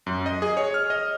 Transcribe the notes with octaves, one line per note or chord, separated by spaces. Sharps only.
F#2
D#5
G#4
C#5
F6
D#5